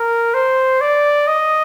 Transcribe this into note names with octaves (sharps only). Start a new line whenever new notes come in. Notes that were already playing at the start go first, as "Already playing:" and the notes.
Already playing: A#4
C5
D5
D#5